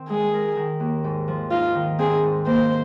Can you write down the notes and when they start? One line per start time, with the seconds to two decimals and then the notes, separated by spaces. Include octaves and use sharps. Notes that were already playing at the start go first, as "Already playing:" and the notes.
Already playing: D#3 C4
0.09 G#3 G#4
0.34 A#4
0.57 D#3
0.80 D#2
1.04 G#2
1.28 F3
1.51 D#4 F4
1.75 D#3
1.99 C4 G#4
2.23 G#2
2.46 A#3 C5